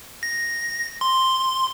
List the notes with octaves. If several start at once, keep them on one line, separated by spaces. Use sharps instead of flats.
A#6
C6